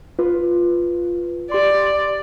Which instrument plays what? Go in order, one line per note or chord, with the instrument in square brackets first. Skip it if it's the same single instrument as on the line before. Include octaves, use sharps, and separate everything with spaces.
[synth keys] F4 B4
[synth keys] G4 C6 [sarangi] D5